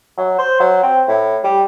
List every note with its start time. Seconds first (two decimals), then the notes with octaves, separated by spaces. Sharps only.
0.17 F#3
0.38 C5
0.60 F#3
0.83 C4
1.08 A2
1.44 G3